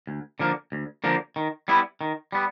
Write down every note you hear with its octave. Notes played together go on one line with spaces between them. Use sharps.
D2
D3 F3 A#3
D2
D3 F3 A#3
D#3
G3 B3 E4
D#3
G3 B3